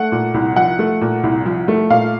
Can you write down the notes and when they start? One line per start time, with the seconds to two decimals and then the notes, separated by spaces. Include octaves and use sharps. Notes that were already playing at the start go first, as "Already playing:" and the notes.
Already playing: A3 F#5
0.12 A#2
0.34 C2
0.56 F3 F#5
0.79 A3
1.01 A#2
1.23 C2
1.46 F3
1.68 A3
1.90 A#2 F5